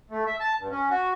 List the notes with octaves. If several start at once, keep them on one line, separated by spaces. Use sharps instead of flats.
A3
E5
A5
G2
C#4
F#4